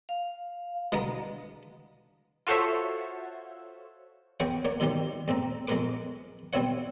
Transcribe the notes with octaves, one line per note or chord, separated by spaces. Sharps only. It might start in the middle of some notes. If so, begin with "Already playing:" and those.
F5
B2 D3 G#3 B3 A#4
F4 F#4 A4 C5 C#5 E5
E2 G#4 B4 C#5 F#5 G5
A#3 C#5 D5
G#2 B2 D#3 G3 A#3 G4
E2 A2 C4 A#5
F2 G#3 B3 A#4 B4 D6
G3 B3 C4 E4 C#5 F#5